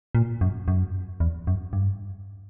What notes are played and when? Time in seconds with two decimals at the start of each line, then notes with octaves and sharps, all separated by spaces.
0.15 A#2
0.41 F#2
0.68 F#2
1.20 E2
1.47 F#2
1.73 G2